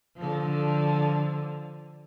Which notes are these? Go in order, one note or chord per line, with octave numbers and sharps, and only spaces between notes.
D3 F3